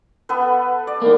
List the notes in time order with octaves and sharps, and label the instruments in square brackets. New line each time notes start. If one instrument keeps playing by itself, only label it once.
[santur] B3 A4 B4
D5
[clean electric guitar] D#3 A#3